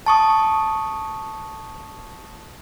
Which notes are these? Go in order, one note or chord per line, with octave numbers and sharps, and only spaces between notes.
A5 C#6 D#6